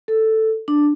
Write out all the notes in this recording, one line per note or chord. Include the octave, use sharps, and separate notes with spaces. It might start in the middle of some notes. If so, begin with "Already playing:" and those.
A4
D4